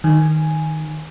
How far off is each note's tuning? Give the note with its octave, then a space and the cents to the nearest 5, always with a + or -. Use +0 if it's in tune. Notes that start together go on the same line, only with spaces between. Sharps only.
D#3 +0 G#5 +0